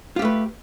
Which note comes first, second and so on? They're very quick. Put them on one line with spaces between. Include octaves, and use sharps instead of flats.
F4 G4 A3 B4